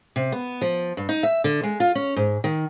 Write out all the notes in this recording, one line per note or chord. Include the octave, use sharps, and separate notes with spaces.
C3
B3
F3
G2
D#4
E5
D3
G#3
F4
C#4
G#2
D#3